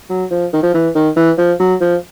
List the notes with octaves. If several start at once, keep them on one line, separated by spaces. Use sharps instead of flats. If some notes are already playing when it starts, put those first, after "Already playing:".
F#3
F3
D#3
F3
E3
D#3
E3
F3
F#3
F3